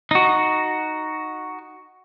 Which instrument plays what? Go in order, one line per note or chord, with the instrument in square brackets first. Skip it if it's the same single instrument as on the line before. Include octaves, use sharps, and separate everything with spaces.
[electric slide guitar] D#4 F#4